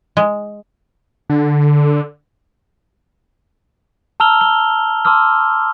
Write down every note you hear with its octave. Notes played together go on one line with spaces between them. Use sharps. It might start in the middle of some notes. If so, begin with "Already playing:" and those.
G#3
D3
A5 A#5 E6 F6 F7 G7
G7
A5 C6 D6 E6 F6